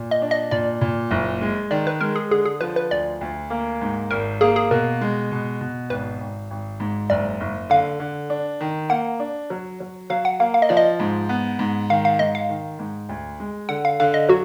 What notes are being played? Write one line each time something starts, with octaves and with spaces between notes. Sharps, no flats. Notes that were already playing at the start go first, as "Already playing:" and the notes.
Already playing: A#2
D#5
D4
D#5
A#2 D5
A#2
F#1
G#3
D#3 D5
B4
G#3 A#4
G#4
D3 G#4
G#4
F3 B4
B4
D2 D5
D2
A#3
G#2
G#1 A#4
A#3 G#4
G#4
B2 A#4
G#3
B2
B2
G#1 B4
G#1
G#1
G#2
F#1 D5
F#1
D3 F5
D3
D4
D#3
A#3 F#5
D4
F#3
F#3
F#3 F5
F#5
A#3 F5
F5
D#5
F3 D5
D#5
G#2
B3
G#2
D#3 F5
F5
G#2 D#5
F5
D#3
G#2
D2
G#3
D3 F#5
F5
D3 F5
D#5
F#3 F#4